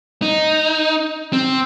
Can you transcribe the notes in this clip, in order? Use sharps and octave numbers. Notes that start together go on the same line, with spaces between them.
D#4
C4